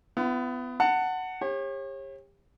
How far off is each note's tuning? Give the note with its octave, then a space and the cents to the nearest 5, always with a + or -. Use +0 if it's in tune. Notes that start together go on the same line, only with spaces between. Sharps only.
B3 +25 F4 -45
F#5 +5 A5 +35
G4 +30 C#5 -35